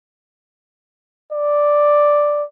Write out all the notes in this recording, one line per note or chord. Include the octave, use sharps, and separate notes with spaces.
D5